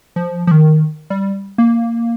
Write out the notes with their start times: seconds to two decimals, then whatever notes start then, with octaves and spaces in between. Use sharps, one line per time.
0.16 F3
0.47 F3
0.51 D#3
1.10 G3
1.58 A#3